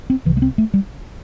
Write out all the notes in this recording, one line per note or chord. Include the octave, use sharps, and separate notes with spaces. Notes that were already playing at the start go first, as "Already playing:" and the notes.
C4
C2 C3 E3
A3
C4
A3
G3